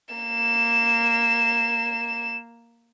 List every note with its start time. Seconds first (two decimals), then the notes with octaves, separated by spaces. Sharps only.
0.15 A#3 E7